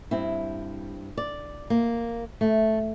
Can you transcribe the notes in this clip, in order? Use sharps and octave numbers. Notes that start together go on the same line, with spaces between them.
G2 C4 E4
D5
A#3
A3